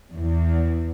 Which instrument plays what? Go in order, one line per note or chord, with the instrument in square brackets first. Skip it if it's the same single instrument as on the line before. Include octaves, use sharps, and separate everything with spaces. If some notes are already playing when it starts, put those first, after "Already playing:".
[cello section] E2